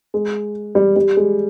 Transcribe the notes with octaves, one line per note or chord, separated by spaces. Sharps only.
G#3
G3
G3
G#3